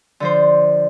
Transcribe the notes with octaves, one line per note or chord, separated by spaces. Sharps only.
D3 F3 C5